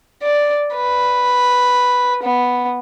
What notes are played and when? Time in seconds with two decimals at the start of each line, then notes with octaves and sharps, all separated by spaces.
0.22 D5
0.74 B4
2.23 B3